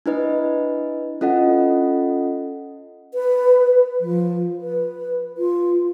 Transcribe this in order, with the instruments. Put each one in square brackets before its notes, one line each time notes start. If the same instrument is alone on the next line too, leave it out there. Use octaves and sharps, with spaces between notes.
[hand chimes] D4 E4 B4 D#5
C#4 F4 A4 D#5 F#5
[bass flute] B4
F3
B4
F4